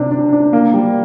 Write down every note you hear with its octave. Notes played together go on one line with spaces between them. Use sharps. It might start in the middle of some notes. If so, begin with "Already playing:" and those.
Already playing: C3 D4
D4
D4
A#3
G3